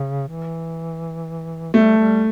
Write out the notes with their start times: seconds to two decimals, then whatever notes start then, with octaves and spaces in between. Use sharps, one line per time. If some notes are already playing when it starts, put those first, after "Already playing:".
Already playing: C#3
0.29 E3
1.74 G3 A3
1.98 G3